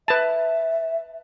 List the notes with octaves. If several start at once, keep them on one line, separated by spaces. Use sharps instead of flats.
B4 E5 A5